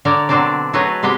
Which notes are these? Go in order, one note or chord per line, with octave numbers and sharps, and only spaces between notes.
D3 A#4 C#5 D5
B2 D3 F#3 C4 D4 D5
F#3 A3 G#4 B4 C#5 D#5
C3 G#3 B3 G4 G5